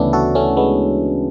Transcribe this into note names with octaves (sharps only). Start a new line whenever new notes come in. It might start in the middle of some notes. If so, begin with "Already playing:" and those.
Already playing: D2 C#3 E3 A3 B3 C#4 D4 E4
F#4 A4
A3 C#4
G#3 B3